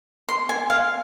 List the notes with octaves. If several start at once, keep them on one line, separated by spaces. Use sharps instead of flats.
C6
G#5
F5